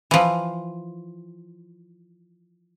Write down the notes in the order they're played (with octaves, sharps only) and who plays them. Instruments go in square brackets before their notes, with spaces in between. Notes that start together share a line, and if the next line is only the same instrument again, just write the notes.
[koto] E3 F3